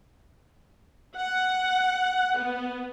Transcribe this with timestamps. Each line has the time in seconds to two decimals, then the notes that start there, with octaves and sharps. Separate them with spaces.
1.16 F#5
2.37 B3